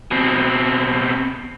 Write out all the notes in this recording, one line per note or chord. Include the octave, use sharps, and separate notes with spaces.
B2 C4